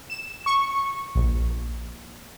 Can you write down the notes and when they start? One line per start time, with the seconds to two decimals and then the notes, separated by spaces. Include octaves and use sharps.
0.10 E7
0.46 C#6
1.15 A#1